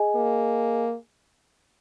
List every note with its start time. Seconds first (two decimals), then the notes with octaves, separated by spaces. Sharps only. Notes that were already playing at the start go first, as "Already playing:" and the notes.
Already playing: G#4 D#5 G#5
0.15 A#3